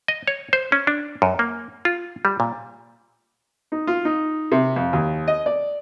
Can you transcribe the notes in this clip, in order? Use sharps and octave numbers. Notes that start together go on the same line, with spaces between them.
D#5
C#5
C5
C#4
D4
F#2
A#3
F4
G3
A#2
D#4
F4
D#4
C3
F2
D#2
D#5
D5